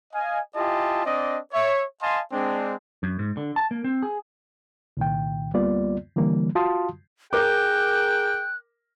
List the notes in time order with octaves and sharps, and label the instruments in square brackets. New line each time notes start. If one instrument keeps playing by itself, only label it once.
[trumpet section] D#5 F5 G#5
E4 F4 G4 D#5 G#5 A5
C4 D4 D5 D#5
C#5 E5
D#5 F5 G#5 A5 C6
G#3 C4 D4
[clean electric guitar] F#2
G#2
D3
A5
A#3
C4
G#4
[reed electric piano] C2 A#2 D#3 G5
D2 G3 A#3 B3 F4 D5
D3 E3 G3 A#3
F4 F#4 F5 A5 C6 D#6
[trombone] G#4 [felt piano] A#4 D6 [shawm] G5 [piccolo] F#6